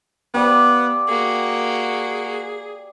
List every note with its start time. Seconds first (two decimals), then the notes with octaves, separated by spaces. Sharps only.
0.34 B3 G4 D5 F5
1.09 A#3 F#4 G#4